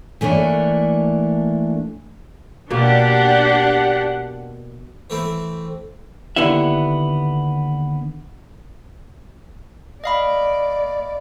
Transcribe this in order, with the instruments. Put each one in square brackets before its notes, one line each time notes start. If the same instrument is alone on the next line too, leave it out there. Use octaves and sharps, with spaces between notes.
[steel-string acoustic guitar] E3 A3 A#3 D4 C#5
[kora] B2 A#3 [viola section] D4 G4 F#5
[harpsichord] E3 A3 C4 E4
[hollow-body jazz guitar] D#2 D3 B3 E4 E5
[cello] D5 [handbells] D#5 F5 B5